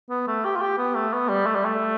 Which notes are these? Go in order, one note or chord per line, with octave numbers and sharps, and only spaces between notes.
B3
A3
G4
F4
G4
B3
A3
B3
G3
A3
G3
A3